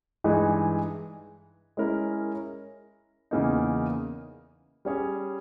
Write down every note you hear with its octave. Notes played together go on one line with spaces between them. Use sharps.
G2 E3 G#3 D#4 G#4
G#3 C#4 E4 A#4
E2 C#3 E3 A#3 D#4
G3 C#4 G#4 C#5